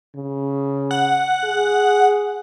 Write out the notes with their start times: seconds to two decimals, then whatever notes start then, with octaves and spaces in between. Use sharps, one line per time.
0.16 C#3
0.91 F#5
1.44 G#4